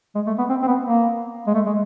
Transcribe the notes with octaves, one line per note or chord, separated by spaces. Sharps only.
G#3
A3
B3
C4
C4
B3
A#3
G#3
A3
G#3